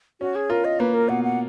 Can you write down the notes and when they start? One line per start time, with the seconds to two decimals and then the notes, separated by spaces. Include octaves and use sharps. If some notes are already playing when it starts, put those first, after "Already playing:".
0.20 C#4 F#4
0.35 G#4
0.50 F4 A#4
0.65 D#5
0.80 A#3 B4
0.94 A#4
1.09 B2 F#5
1.24 F#5